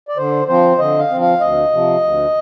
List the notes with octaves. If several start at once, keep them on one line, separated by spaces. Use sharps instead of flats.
D5
D3 C5
F3 C4 C5
D3 D#5
F5
F3 C4
F5
D2 D#5
C3 F3
D2